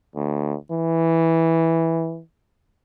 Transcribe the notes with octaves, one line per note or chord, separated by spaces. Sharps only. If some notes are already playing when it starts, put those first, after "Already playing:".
D2
E3